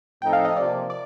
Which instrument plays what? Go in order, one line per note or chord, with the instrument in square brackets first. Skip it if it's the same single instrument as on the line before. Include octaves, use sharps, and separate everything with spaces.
[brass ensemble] A2 F3 C4 D#4 A4 [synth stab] G5
[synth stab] F5
D#5
[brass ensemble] C3 F3 A#3 [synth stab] D5
[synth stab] D5